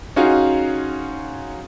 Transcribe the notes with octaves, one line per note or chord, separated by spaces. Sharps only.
C#4 D#4 F4 F#4 G#4 F5